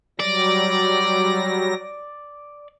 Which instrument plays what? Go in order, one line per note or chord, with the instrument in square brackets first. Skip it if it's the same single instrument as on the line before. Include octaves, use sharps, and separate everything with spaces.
[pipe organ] F#3 G3 A#6 [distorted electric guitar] D5